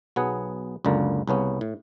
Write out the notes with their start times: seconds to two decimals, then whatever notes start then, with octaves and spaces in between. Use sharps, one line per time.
0.16 B1 F#3 B3 G#4 F#5
0.85 C#2 F#2 D3 A#3
1.28 C2 C#3 B3 C#4
1.61 A2